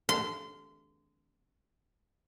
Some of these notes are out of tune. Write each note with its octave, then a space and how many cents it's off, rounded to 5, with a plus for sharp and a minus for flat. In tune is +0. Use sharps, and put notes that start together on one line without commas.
C6 -25